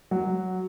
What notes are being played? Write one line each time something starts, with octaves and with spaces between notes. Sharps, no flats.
F#3